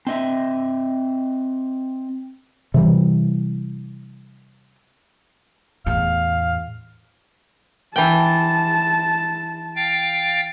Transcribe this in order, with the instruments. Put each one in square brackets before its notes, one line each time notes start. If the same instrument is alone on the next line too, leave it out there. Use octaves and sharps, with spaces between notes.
[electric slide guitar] C4 D#5 E5
[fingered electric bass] C3 E3 G3
[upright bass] E2 A2 [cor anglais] F5
[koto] E3 G5 [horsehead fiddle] A5
[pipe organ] F5 G5 A6